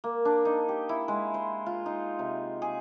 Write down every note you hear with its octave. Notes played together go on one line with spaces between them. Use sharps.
A#3
D4
D#4
G4
E4
G#3
C5
F4
D#4
C3
G#4